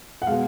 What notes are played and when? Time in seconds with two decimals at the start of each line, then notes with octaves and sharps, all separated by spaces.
0.22 F#5
0.27 B2 G#3 F5